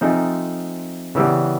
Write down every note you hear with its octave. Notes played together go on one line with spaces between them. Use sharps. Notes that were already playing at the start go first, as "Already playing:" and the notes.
F3 A3 C4 D#4 G#4
C#3 E3 G3 B3